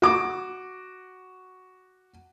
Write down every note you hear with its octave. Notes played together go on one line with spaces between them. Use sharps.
F#4 D6